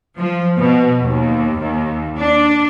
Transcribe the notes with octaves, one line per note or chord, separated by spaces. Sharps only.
F3
B2
D#2
D#2
D4